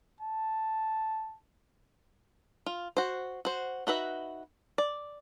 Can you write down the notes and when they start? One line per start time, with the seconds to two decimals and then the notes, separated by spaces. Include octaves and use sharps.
0.21 A5
2.66 F4
2.97 F#4 C5
3.45 F#4 C5
3.87 D#4 F#4 B4 E5
4.78 D5